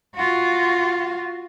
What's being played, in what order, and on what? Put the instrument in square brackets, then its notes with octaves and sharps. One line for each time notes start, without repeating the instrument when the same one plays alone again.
[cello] F4 F#4